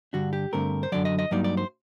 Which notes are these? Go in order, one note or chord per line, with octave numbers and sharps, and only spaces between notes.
G2 D3 G3 D4 F#4
G4
G2 D3 A3 C4 A#4
C5
F#2 D3 F#3 D5
D#5
D#5
G2 F#3 A#3 D#4 D5
D5
C5